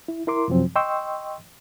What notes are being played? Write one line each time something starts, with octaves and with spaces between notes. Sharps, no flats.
E4
E4 A#4 C6 D6
F#2 C3 F3 F#3 C4
D#5 G5 C6 C#6 E6